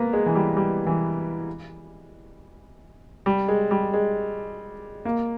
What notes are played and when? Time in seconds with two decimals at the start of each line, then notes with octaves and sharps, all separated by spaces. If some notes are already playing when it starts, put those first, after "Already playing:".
Already playing: A#3 B3
0.13 G#3
0.26 E3
0.35 G3
0.57 G3
0.87 E3
3.26 G3
3.48 G#3
3.71 G3
3.94 G#3
5.05 A#3